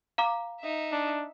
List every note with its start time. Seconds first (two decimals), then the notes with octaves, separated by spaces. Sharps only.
0.18 F5 A#5 D6
0.60 D#4 E5
0.92 D4